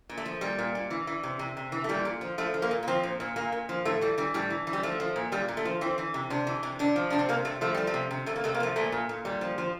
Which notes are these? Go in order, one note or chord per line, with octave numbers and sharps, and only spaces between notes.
A#2
A3
F3
A#2 G3
A#2
A#2
E3
E3
C3
C3
C3
E3
A3
A#2 G3
A#2
F3
F3 A3
F3
A#3
A#2
A#3
F3 C4
A#2
A#2
A#2 A#3
A#2
F3
A2 A3
E3 G3
E3 G3
A2 G3
E3
E3
G3
F3 A3
F3
A#2
A#2 G3
A#2
A3
F3
E3 C4
E3
C3
C3 D4
E3
C3
C3 D4
F3
C3 D4
C4
C3 A#3
C3 A3
F3 A3
F3 G3
A3
C3
C3
C3 A3
A#3
C3 A3
A#3
F3 A3
A#2 A3
A#2
A#2
A#2 G3
F3
F3